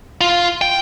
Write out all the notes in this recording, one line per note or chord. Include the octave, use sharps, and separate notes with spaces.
F4
G5